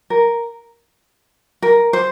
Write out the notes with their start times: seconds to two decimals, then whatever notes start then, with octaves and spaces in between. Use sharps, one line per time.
0.10 A#4
1.62 A#4
1.93 C5